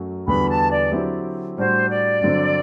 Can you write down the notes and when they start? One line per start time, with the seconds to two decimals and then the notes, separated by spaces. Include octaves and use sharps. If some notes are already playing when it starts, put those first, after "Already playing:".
Already playing: F#2 F#3 A3
0.27 E2 D3 G3 B3 F#4 B5
0.50 A5
0.71 D5
0.92 D3 F#3 C4 E4 G4
1.57 A2 G3 D4 F#4 C5
1.90 D5
2.21 G2 D3 F#3 C4